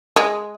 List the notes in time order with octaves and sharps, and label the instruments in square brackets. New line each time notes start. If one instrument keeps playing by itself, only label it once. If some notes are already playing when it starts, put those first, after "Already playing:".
[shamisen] G#3